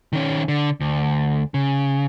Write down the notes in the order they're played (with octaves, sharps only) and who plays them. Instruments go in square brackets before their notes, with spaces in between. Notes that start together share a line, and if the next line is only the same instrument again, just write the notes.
[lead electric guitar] D#3 C#4
D3
D2
C#3